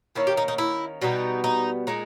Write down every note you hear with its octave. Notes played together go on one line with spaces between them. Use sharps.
D#3 A#3 C#4 E4
G4
D#4
D#4
E4
B2 G3 B3 D#4
D#4
A#2 G#3 D#4